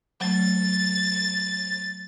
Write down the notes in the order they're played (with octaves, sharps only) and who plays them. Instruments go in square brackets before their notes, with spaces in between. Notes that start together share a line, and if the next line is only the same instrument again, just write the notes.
[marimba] F#3 A3 [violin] A6